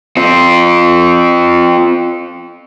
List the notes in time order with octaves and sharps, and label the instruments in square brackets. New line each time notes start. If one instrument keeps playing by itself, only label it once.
[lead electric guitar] C4 F4